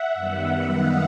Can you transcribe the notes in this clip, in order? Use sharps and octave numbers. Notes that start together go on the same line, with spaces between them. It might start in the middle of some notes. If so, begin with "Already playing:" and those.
Already playing: E5 F#5
F#2 D#3 G3 B3
D#5 F5